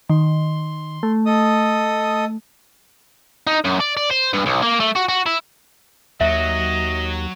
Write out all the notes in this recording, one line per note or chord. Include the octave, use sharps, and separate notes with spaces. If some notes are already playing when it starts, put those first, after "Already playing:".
D#3 C6
A3
A4 D#5 D#6
D#4
F#2
D5
D5
C5
G2
B1
A#3
A3
F#4
F#4
E4
D#2 F#3 F#4 D#5 E5